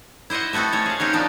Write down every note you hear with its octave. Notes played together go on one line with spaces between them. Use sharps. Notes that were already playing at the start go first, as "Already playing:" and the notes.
E4 C5 D#5 E5 F#5
A3 B3 C4 F#4 A4
A3 C#4 C#5
G#4 F5
C4 C#4 D#4 G4
D#3 F3 B3 D4 D#4